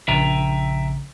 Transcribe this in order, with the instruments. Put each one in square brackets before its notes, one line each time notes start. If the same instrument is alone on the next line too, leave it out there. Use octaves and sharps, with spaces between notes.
[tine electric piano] A#1 C#3 [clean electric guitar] E5 G5 A#5